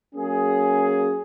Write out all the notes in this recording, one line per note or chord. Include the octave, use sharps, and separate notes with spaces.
F#3 A#3 C#4 G#4